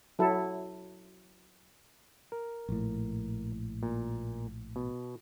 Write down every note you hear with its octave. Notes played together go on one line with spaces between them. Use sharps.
F#3 E4 A4
A#4
A#1 A2
A#2
B2